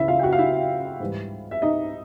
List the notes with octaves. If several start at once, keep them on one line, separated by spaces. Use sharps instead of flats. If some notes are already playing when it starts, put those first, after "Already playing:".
Already playing: C#2 C#3 E3 E4 E5
F4 F5
G5
F#4 F#5
F5
E4 E5
G#2 E3 G3
E5
D#4 D#5